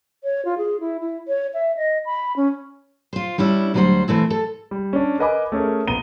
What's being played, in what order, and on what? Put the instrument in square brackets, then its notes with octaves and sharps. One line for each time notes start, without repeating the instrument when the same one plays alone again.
[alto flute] C#5
F4
G#4
E4
E4
C#5
E5
D#5
B5
C#4
[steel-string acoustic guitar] F4 C5
G3 C#4 D4 E4
D2 F#3 G3 A4 C5 F#5
E3 A3 C4 E4
A4
[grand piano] G3
C#4 D4
A#4 B4 D#5 G#5 B5 D6
A3 C#4 G#4 A#4
A#1 B3 A#5 D#7 G7